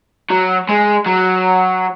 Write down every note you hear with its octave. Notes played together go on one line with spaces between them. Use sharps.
F#3
G#3
F#3